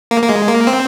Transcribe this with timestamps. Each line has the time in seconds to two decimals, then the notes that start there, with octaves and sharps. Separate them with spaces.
0.11 A#3
0.23 A#3
0.30 G#3
0.48 A#3
0.67 C4